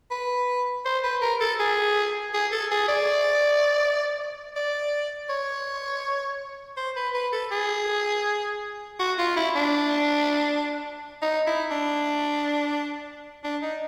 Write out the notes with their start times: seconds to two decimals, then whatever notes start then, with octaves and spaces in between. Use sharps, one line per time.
0.11 B4
0.85 C5
1.04 B4
1.22 A#4
1.41 A4
1.59 G#4
2.34 G#4
2.52 A4
2.71 G#4
2.88 D5
4.56 D5
5.29 C#5
6.77 C5
6.96 B4
7.14 B4
7.33 A4
7.51 G#4
8.99 F#4
9.18 F4
9.36 E4
9.55 D4
11.22 D#4
11.47 E4
11.71 D4
13.44 D4
13.62 D#4